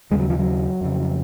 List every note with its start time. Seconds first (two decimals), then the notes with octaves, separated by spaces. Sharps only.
0.11 D#2 C#3 G#3
0.19 F#3
0.30 F3
0.39 F#3
0.81 F2 C#3